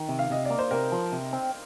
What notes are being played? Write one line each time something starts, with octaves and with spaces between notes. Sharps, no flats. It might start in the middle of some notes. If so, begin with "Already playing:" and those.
Already playing: D#3
C3
F5
C3 D#5
D5
A#3
C5
C3 A#4
F3
C3
C4